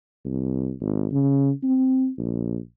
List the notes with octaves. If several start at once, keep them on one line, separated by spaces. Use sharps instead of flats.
C2
G#1
C#3
C4
A#1